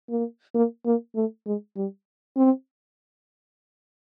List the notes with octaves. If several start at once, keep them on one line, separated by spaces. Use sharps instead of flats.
A#3
A#3
A#3
A3
G#3
G3
C4